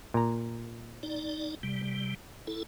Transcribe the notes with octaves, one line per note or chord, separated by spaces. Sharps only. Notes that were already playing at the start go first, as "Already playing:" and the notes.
A#2 A#5
D#4 D5
C3 G3
E4 A4